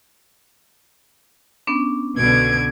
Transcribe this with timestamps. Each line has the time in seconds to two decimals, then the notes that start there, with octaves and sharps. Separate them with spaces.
1.67 B3 C#4 D4
2.17 C2 B2 D3 G#6 D7